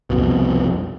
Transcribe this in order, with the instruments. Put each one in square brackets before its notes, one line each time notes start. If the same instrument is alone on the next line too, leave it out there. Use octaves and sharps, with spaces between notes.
[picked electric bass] C2 F2 B2